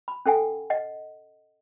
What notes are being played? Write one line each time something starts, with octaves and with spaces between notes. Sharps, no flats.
B5
C#4 A4 F#5 G#5
D#5 F#5